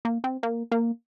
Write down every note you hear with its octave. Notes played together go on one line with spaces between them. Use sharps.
A#3
C4
A#3
A#3